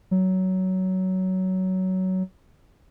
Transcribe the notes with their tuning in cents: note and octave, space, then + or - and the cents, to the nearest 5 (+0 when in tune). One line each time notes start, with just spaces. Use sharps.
F#3 +15